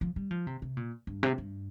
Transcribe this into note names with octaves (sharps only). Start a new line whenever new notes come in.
F3
G3
F3
C3
C3
A#2
G2
C3
G2